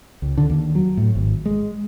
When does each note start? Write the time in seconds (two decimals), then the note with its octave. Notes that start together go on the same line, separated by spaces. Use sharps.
0.22 C#2
0.38 D3
0.50 D#2
0.75 F#3
0.97 A2
1.15 G#1
1.46 G#3